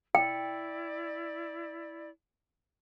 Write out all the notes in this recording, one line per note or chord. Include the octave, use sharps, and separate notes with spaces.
E4 D5 G5